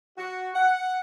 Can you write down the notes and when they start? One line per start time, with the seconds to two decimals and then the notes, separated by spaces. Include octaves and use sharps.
0.18 F#4
0.56 F#5